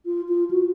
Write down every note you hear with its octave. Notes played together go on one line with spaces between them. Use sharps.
F4
F4
F#4